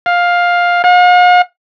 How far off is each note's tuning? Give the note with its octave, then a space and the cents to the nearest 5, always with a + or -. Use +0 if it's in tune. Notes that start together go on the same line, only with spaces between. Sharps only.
F5 +10
F5 +45